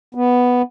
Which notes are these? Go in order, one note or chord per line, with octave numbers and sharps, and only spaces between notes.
B3